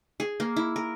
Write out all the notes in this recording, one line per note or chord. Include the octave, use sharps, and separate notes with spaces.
G#4
A#3
E4
A#4